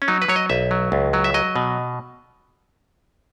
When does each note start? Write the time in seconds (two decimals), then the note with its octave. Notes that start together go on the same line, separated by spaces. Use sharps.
0.02 C#4
0.08 F#3 D#4
0.22 B4
0.28 F#3 C#5
0.36 D#5
0.50 B1 E5
0.71 F#3
0.92 C#2
1.13 F#3
1.24 E5
1.34 F#3 D#5
1.56 B2